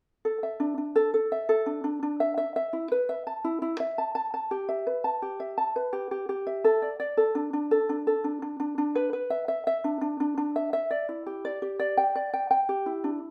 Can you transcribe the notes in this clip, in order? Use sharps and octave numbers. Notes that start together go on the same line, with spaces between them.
A4
E5
D4
D4
A4
A4
E5
A4
D4
D4
D4
E5
E5
E5
E4
B4
E5
A5
E4
E4
E5
A5
A5
A5
G4
E5
B4
A5
G4
E5
A5
B4
G4
G4
G4
E5
A4
D5
D5
A4
D4
D4
A4
D4
A4
D4
D4
D4
D4
B4
B4
E5
E5
E5
D4
D4
D4
D4
E5
E5
D5
E4
G4
D5
G4
D5
G5
D5
G5
G5
G4
E4
D4